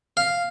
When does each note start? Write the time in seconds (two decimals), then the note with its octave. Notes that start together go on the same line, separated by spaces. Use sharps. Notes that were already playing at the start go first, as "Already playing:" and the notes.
0.17 F5